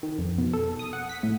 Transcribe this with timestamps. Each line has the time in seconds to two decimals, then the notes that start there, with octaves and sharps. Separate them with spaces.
0.03 D#3
0.19 F2
0.38 B2
0.53 A4
0.79 D#6
0.93 F#5
1.09 B6
1.23 A2